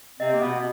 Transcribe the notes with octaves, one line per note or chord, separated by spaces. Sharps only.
C3 C4 D#5
A#3
B2 B3